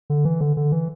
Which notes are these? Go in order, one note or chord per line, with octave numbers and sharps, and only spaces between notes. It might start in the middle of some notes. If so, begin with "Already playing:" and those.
D3
E3
D3
D3
E3